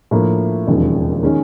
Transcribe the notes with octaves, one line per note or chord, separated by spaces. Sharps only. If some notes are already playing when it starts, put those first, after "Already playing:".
A2 F3 A#3 D4
E1 D#2 C#3 F3
D#3 G#3 C#4